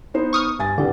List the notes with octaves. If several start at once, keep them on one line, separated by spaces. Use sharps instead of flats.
B3 D#4 C5
C#6 D#6 F6
G2 G#5 A6
C2 G2 D3